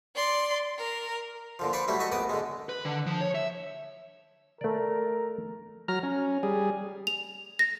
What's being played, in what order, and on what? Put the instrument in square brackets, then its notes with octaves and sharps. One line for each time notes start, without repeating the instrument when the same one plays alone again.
[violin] D5 C6
A#4
[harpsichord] A#2 D3 F3
B4 C5 D5 B5 C#6
F#3 G3 A3 E4
F#3 A3 D#5 E5 C#6
A#1 B3 D5 D#6
D3 G#3
[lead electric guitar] B4
D3
F3
C#5
E5
[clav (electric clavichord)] A3 D5 [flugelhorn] A#4
[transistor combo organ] F#3 A#5 F6
C#4
G3 G#4
[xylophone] F7
A#6